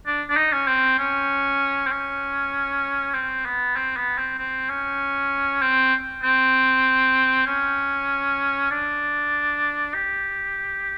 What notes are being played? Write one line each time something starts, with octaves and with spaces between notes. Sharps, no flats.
D4
D4
D#4
C#4
C4
C#4
C4
C#4
C4
B3
C4
B3
C4
C4
C#4
C4
C4
C#4
D4
G4